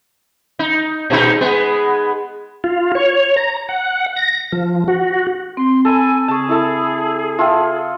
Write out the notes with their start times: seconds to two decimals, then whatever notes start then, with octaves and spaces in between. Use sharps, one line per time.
0.59 D#4
1.10 A#2 G#3 D#4
1.41 G#3 B3
2.64 F4
2.95 C#5
3.36 A#5
3.69 F#5
4.16 A#6
4.52 F3
4.88 F#4
5.57 C4 C6
5.85 A4 G#5 B5
6.28 C#3 G#4 A5 C#6
6.49 E4 A4
7.39 F4 A4 E5 G5 A5